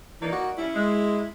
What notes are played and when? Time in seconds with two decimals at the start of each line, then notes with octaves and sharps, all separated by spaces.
0.21 E3 A#3 D#4 D5
0.32 F#4
0.58 G3 C#4 E4
0.74 G#3